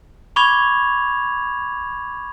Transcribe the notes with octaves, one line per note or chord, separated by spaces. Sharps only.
B5 C#6 D6 G#6 F7